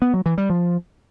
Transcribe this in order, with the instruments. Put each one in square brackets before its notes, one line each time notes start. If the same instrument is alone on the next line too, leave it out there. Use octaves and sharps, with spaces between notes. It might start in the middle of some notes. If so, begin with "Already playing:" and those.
[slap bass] B3
F#3
E3
G3
F3